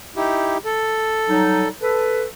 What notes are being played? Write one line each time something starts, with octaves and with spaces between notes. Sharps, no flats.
D#4 E4 G4
A4
F#3 G3 D#4
A4 B4